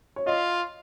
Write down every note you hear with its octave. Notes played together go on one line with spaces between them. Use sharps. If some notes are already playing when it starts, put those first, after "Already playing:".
C#5
F4 D#5